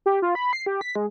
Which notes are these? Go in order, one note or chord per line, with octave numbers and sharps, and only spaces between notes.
G4
F4
B5
C7
G4
B6
G#3